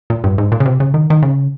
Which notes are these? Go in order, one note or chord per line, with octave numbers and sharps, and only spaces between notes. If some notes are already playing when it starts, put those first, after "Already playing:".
A#2
G2
G#2
A#2
C#3
C3
C#3
D#3
D#3
C#3